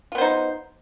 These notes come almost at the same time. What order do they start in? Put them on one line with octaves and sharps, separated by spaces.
F4 B3 C5 D#4